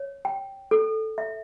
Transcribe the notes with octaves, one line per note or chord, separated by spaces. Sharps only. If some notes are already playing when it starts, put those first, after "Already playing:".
Already playing: C#5
G5
A4
E5